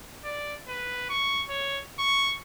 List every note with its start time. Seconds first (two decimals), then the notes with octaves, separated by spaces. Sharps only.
0.24 D5
0.68 B4
1.09 C#6
1.49 C#5
1.99 C#6